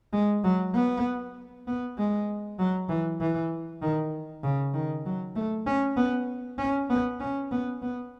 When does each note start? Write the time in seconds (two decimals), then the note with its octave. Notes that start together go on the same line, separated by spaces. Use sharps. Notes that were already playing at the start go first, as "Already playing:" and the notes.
0.13 G#3
0.44 F#3
0.74 B3
1.67 B3
1.98 G#3
2.59 F#3
2.89 E3
3.20 E3
3.82 D#3
4.43 C#3
4.74 D#3
5.05 F#3
5.36 A3
5.66 C#4
5.97 B3
6.58 C#4
6.90 B3
7.20 C#4
7.51 B3
7.82 B3